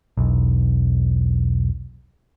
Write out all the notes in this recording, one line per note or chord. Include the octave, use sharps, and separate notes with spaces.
E1 B1